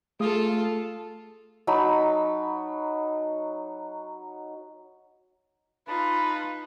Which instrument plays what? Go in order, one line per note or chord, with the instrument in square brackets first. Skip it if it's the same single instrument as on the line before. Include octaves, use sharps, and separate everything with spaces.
[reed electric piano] A3 G#4 D#6 [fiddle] F4 A4
[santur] F#3 D#4 A5 B5
[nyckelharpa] D#4 [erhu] F4 [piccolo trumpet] B4 [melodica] A5 B5